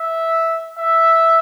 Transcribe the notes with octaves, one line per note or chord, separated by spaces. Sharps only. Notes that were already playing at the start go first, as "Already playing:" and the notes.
Already playing: E5
E5